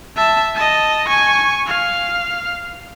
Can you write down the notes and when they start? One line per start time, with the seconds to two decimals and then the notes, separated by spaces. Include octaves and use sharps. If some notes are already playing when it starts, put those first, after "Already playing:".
0.17 E5 A5
0.56 D#5 A5
1.08 G#5 C#6
1.66 F5